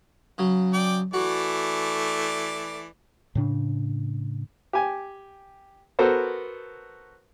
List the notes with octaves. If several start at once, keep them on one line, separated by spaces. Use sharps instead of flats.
C#3 F#3
D5 G5
E3 A3 F#4 D5
A2 C#3 D4
G4 G#5
B3 F#4 A4 A#4 C5